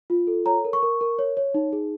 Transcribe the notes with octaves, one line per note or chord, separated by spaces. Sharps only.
F4
A4
C#5 A#5
A#4
C#6
A#4
A#4
C#5
C#5
D#4
G#4